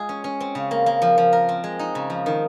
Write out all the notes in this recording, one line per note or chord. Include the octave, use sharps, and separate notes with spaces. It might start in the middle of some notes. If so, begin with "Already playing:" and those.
Already playing: G#3 F4 G#4
C#4
C#4
C4
C#3
A#3
A#3
F3
F3
A#4
C4
G#3
D#4
C#3
F3
D#3